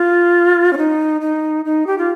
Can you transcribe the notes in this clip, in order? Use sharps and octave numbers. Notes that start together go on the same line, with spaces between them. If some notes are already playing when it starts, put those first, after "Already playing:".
Already playing: F4
C#4
D#4
D#4
D#4
G4
F4